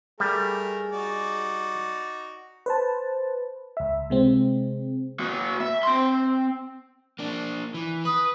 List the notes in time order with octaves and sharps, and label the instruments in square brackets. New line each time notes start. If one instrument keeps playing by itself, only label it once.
[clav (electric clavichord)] G3 [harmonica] A3 A#4 [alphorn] G#4
[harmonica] D#4 F#4 D5
[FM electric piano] B4 C5 A5
C#2 E5
C3 G#3 C4
[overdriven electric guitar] A#3 F#4
E5
C4 C6
A#3 D4
E3
[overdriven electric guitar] B4 [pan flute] D#6